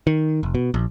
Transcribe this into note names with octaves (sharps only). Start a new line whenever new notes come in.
D#3
F1
B2
A#1